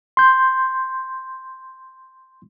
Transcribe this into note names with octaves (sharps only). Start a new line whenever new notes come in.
C6 G6